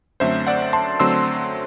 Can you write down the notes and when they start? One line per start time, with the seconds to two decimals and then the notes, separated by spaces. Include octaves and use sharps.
0.20 F#2 D3 F#3 A3 C4 C5 E5
0.47 D5 F#5
0.73 A5 C6
1.00 D3 F#3 A3 C4 C6 E6